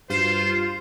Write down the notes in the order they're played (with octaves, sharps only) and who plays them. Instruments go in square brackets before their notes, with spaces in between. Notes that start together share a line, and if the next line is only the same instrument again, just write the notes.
[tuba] G2 [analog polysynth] F4 [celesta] F#4 C7 E7 [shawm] C5